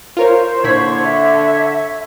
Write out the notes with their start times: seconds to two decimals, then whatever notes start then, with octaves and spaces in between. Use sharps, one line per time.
0.17 F4 A#4 C5 C#5
0.64 A#2 D3 E4 C#5 B5
1.02 C#5 E5